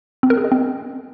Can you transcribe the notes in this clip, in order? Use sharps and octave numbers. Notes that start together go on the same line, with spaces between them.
C4
A#4
G#4
D#5
C4